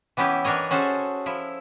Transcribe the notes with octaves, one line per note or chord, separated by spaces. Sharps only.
E3 B3 C#4 E4 G4
E3 D4 A#4 C#5 D#5
C#4 F#4 G#4 A4 C5
F3 E4